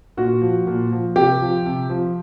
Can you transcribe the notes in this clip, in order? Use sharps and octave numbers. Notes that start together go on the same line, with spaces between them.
A#2 F#4
F3
A#2
F3
C3 G4
F3
C3
F3